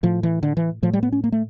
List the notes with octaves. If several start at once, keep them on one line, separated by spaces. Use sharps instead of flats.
A2 F3
E3
D3
E3
A2 F3
G3
B3
C#4
A#3
A3